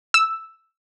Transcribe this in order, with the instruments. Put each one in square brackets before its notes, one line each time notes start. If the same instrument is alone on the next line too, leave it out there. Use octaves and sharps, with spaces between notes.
[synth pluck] E6